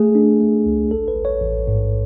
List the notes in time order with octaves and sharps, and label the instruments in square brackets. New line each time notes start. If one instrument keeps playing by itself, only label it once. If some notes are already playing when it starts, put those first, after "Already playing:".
Already playing: [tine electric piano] A3 G#4
D4
A3
C#2
A1 A4
B4
A1
C#5
A1
G#2